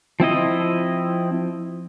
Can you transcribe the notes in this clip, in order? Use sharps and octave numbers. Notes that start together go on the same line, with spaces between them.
F3 C4 E4 D#5